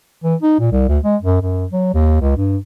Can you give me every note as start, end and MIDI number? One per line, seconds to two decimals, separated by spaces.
0.24 0.35 52
0.42 0.59 63
0.59 0.70 46
0.72 0.85 36
0.88 0.98 38
1.04 1.16 56
1.22 1.42 42
1.42 1.65 42
1.72 1.90 54
1.94 2.16 39
2.21 2.33 37
2.37 2.57 43